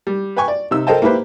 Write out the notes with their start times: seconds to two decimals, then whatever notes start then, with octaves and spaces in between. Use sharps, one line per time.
0.07 G3
0.36 B4 G5 G#5 C#6
0.48 D5
0.71 C3 D#4 E6
0.87 A4 A#4 C5 D#5 G5 A5
1.02 A#3 E4 G4 B4 C5